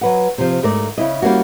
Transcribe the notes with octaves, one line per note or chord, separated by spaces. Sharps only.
F#3 B4 F#5
C3 F3
G#2 A3 A#4 D5
C#3 E4 D#5
G3 A#3 C#4 F#4